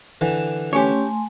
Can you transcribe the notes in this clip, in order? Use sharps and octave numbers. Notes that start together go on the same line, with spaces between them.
D3 E3
A3 C#4 G4 C#5 G#5 C6